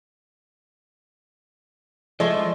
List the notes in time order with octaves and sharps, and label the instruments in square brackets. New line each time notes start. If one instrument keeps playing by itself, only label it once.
[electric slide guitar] F3 [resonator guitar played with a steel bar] G#3 [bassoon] A3 [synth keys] D5